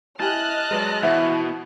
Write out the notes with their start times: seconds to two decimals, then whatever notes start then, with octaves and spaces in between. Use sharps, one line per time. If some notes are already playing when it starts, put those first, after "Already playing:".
0.20 E4 G4 D#5 G#5 A5 F6 F#6
0.71 F#3 G#3 B4 D5
1.03 B2 E3 E4 F#4 C5 E5 F#5